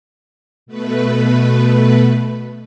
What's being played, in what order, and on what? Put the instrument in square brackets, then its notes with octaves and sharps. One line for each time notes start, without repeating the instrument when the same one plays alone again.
[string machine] B2 A3 B4